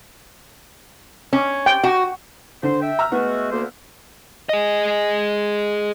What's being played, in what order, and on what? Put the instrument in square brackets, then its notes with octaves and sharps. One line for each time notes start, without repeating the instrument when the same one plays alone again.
[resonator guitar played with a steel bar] C#4
[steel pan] G5
[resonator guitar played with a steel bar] F#4
[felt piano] D3 [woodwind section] C5
[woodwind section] E5 G5
[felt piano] A#5 E6 F6
[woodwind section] G#3 A3 F#4 [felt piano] B3
[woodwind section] D2 A#3 C5
[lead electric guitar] G#4 D#5